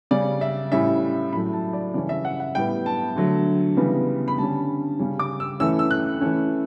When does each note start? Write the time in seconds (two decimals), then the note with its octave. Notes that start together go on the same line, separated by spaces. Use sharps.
0.11 C#3 G3 C#4 D5
0.41 E5
0.72 A2 G3 C#4 E5
1.33 A2 F#3 A3 B5
1.53 A5
1.73 D5
1.94 C#3 E3 G3 C#4 D5
2.09 E5
2.25 F#5
2.40 F#5
2.55 A2 G3 B3 G5
2.86 A5
3.16 D3 F#3 A3
3.77 C#3 E3 G3 B3
4.28 B5
4.38 D3 G3 C#4 A5
4.99 C#3 G3 C#4
5.19 D6
5.40 E6
5.60 E3 A3 C#4 E6
5.79 E6
5.91 F#6
6.21 E3 A3 C#4